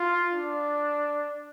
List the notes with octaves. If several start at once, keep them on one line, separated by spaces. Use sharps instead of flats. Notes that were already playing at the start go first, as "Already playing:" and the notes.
Already playing: F4
D4